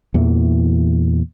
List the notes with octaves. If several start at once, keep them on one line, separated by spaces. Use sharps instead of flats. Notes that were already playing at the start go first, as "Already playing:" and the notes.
E2 A#2 E3